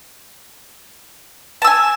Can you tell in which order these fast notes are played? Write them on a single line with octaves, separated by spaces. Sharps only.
A5 E6 G#5